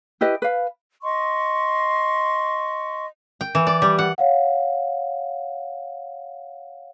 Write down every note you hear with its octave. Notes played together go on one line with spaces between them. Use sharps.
E4 G4 B4 D#5
B4 F5
D#5 C6 C#6
G5
E3
D5
G3
F#5
C#5 F5 F#5